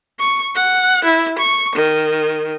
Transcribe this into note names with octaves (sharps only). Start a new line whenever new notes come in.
C#6
F#5
E4
C#6
D#3